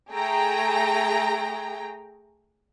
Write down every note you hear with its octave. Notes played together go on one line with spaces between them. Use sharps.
A3 G#4 G5 A#5